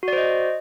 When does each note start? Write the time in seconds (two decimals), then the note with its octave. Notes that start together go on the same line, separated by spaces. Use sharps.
0.03 F#4
0.08 D5
0.13 C5
0.18 D#5